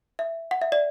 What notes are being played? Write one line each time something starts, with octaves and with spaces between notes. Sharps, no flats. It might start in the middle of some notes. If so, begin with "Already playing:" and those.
E5
F#5
E5
D5